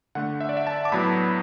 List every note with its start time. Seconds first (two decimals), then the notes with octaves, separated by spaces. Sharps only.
0.15 D3 A3 F#5
0.41 E5
0.49 D5
0.57 E5
0.67 A5
0.85 D6
0.92 A2 F#3 B3 B5